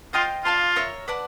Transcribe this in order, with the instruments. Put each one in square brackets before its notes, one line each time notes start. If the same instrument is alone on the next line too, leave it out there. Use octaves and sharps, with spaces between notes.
[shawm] F4 [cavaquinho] C5 D#5 G5 C6
[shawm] F4 [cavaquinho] D5 F5 A5 C6
[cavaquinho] A#4 C#5 E5
B4 D5 F#5 A5